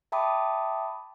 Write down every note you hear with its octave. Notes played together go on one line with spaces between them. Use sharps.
E5 G5 A5 B5 D6 D#6